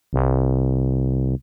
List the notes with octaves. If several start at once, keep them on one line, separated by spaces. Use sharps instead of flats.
C2